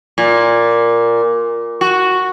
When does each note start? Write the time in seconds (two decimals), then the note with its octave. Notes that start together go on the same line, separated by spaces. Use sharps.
0.18 A#2
1.81 F#4